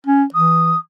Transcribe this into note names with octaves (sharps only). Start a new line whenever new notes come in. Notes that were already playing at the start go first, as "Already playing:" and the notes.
C#4
E3 D#6